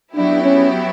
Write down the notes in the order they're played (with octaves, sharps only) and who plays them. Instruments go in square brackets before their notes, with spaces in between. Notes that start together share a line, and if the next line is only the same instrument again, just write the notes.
[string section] F#3 B3 E4 G4 [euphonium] D4
[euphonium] C#4